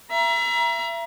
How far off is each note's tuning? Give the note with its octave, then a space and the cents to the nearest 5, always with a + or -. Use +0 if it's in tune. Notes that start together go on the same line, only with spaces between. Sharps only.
E5 +35 A#5 +30